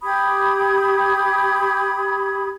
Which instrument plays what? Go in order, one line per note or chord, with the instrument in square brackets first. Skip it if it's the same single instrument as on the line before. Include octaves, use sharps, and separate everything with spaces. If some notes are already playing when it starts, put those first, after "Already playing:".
[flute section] G4 B5 D#6 G#6